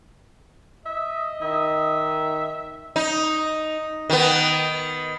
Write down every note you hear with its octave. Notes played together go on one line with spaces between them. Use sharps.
D#5 E5
D#3 E5
D#4
D#3 B3